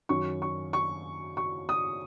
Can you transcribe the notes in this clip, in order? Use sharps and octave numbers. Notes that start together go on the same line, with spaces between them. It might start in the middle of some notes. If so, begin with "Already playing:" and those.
F#2 D#3 C#6
C#6
C#6
C#6
D#6